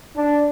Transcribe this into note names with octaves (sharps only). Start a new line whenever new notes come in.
D4